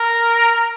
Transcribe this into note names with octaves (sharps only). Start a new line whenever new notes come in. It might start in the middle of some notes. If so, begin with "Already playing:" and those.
Already playing: A#4